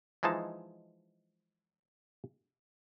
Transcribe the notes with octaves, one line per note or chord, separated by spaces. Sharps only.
E3 F3 G#3 D#4 A5